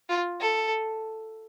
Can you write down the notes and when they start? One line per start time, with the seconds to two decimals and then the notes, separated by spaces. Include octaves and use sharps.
0.09 F4
0.41 A4